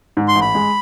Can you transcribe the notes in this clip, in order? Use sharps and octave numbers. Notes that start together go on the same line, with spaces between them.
G#2
C6
A1
B5
G#3